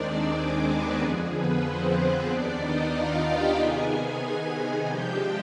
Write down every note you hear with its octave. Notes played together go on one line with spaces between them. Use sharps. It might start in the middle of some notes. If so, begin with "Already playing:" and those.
Already playing: D#2 D#3 G#3 C4 D4 D#4 D5
G#4
B3 B4
F2 D3 F3 G#4
B3 B4
C4 C5
C4 C5
D#2 D#3 B3 D4 D5
D#4 D#5
F4 F5
G4 G5
C3 D#3 B3 D#4 G#4 G#5
C3 F3 G#3 D4 G4 G5